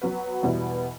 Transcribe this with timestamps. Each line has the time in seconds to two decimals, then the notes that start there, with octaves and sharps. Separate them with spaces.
0.02 F#3 B3 F#4 B4
0.43 E2 B2 G3 B3 E4